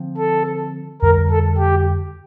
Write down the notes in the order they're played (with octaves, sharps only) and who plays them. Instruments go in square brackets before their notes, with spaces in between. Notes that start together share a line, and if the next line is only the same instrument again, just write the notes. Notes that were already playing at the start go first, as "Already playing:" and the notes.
Already playing: [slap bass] D3 F3 C4
[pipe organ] A4
[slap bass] F2 D3 G3 [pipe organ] A#4
[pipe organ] A4
G4